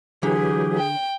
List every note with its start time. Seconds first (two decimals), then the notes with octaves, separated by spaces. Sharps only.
0.23 D3 E3 F#3 G4 G#4
0.78 G5